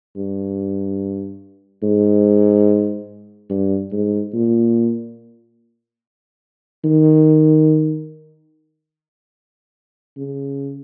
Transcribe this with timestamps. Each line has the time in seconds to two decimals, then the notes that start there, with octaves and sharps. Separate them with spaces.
0.16 G2
1.83 G#2
3.50 G2
3.92 G#2
4.33 A#2
6.84 D#3
10.17 C#3